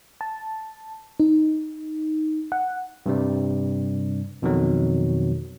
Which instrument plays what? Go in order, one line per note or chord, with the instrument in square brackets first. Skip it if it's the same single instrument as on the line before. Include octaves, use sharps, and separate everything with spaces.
[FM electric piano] A5
D#4
F#5
[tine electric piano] G2 C3 G3
F2 B2 D#3 F#3